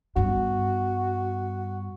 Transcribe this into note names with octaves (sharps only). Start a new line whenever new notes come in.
G2 B3 F#4